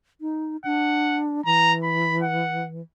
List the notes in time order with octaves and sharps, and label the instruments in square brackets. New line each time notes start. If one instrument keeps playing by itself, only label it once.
[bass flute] D#4
[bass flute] D4 [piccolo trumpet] F#5
[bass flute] E3 [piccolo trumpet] A#5
[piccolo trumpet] B5
F#5